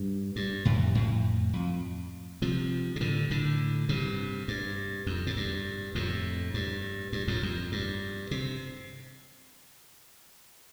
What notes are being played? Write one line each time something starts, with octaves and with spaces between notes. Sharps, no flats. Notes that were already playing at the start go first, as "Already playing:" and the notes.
Already playing: G2
G2
F2 A2
F2 A2
F2
C3 F3
C3
A2 D3
A2 D3
G2 C3
G2
F2
A2
G2
F2 A2
G2
G2
F2 A2
F2
G2
C3